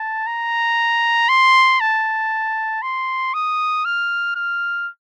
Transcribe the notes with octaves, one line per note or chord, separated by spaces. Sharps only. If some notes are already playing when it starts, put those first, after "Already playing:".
Already playing: A5
A#5
C6
A5
C6
D#6
F6
F6